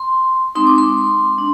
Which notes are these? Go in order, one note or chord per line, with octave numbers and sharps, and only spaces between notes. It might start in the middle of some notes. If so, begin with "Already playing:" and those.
Already playing: C6
G#3 C4 D#4 C6
D6
C6
G#3 D4